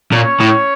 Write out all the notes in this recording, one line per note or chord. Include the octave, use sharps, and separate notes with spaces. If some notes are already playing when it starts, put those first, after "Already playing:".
A#2 C#4 C#5
A2